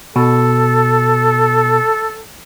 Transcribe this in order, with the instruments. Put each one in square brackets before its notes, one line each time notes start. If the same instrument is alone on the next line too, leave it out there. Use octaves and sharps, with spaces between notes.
[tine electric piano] B2 [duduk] A4